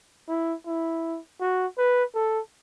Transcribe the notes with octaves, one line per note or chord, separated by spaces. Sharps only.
E4
E4
F#4
B4
A4